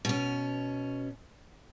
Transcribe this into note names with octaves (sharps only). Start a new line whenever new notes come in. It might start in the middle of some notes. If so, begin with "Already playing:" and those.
B2 C#4